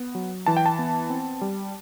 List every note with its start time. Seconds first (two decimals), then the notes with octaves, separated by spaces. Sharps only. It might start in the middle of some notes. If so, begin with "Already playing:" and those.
Already playing: B3
0.15 F#3
0.46 E3 A5
0.57 G5
0.66 A5
0.79 B3
1.10 C4
1.41 G3